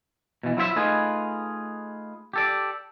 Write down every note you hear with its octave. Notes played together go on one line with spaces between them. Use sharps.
B2 E3
F#3 E4 F4 C5 C#5 E5
A3 D#4 F4 G#4 B4
G4 A4 D5